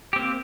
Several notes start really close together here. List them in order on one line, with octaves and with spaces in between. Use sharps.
G4 C4 A#3